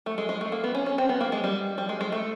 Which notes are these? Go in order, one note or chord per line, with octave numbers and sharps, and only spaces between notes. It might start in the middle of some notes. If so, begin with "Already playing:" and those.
A3
G#3
G#3
A3
A#3
B3
C#4
C#4
C4
B3
A#3
G#3
G3
G3
G#3
G#3
A3